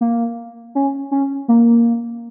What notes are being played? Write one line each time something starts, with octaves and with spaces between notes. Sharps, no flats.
A#3
C#4
C#4
A#3